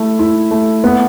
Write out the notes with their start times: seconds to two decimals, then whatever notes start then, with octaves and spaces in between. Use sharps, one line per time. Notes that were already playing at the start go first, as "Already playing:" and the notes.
Already playing: A3 E4
0.19 E4
0.51 A3
0.84 B3